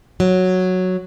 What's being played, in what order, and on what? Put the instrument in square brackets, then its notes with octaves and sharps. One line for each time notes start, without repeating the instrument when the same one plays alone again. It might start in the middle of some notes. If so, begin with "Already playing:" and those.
[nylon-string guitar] F#3